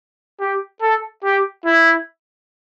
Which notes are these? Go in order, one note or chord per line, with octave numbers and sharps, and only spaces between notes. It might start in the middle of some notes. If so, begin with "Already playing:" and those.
G4
A4
G4
E4